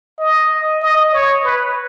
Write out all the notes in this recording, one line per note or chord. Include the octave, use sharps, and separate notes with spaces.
D#5
D#5
C#5
B4